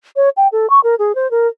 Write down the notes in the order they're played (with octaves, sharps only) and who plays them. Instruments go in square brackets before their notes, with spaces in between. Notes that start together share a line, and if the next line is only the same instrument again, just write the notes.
[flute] C#5
G5
A4
C#6
A#4
G#4
C5
A#4